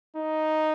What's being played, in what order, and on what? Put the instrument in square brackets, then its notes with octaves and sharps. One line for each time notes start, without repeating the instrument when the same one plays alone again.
[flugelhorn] D#4